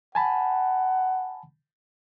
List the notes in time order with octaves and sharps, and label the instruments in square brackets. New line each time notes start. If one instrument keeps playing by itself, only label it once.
[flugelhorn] F#5 [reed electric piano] G#5 A5 B5